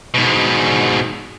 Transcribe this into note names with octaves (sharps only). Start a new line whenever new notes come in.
G#2 B2